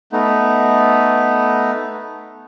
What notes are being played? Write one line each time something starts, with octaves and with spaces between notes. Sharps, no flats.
A3 B3 D#4